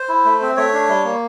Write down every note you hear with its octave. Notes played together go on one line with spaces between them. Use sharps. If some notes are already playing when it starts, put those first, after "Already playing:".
Already playing: C5
E4
A3
C4
A3 C#5
D4
G3
A#3